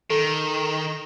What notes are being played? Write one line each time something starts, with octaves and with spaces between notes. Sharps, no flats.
D#3 A4